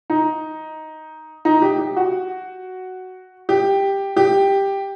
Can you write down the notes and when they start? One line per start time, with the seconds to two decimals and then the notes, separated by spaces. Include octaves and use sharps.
0.10 D#4
1.45 D#4
1.62 G4
1.78 G4
1.96 F#4
3.49 G4
4.17 G4